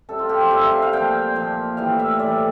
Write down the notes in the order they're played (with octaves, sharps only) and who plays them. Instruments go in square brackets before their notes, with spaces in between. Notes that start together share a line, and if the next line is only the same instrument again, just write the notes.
[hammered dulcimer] C3 G3 A4
F4
G4
C5
C3 G3 E5
F5
F5
F5
A#2 F3 G5
A#2 F3
A2 E3 G3 F5
E5
A2 E3 G3 D5